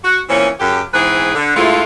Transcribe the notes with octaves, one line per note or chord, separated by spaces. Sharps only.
F#4
A#2 E3 C4 C#4
F#2 C#3 G4
G#2 E3 B3 C4 G#4 B4
D3
G2 G#3 A3 E4 F4